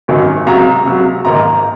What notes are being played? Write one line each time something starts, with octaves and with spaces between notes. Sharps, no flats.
G#1 F#2 D#3 F#3
C#2 C3 F#3 A#5
C#2 C3 F#3
A#1 G#2 D#3 A#3 A#5